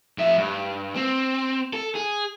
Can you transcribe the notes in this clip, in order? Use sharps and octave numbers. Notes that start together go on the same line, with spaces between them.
F2 E5
G2
C4
A4
G#4